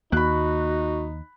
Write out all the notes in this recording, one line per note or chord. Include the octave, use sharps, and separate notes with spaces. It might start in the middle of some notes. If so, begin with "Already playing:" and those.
D#2 A#3 D#4 F#4 B5 F#6